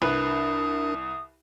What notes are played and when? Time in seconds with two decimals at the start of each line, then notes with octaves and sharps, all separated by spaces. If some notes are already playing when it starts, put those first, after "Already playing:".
0.02 C2 D4 A#4 B4 D#6